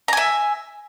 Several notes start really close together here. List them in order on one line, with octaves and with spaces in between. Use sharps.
A#5 G#5 E5